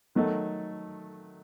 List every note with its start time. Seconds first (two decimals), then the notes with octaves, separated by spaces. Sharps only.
0.15 D#3 F#3 A3 D#4